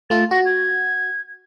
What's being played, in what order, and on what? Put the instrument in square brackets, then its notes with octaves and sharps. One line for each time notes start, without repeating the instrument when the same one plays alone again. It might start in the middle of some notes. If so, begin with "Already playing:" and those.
[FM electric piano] A3 F4 A4 [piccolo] A6
[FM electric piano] F#4 [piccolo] A#6
[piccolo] G#6